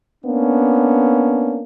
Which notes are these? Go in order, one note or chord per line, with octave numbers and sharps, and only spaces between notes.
A#3 B3 C#4 D4